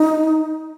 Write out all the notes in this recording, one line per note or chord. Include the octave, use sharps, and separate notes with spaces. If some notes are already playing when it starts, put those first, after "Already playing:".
Already playing: D#4